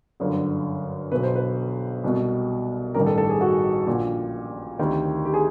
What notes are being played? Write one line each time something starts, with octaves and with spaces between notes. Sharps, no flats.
G1 F#2 D3
B1 B2 B4
C5
B4
C2 B2
A1 G2 D#3 A#4
A4
A4
G#4
F#4
A#1 A#2
D2 C3 D#3
G4
G#4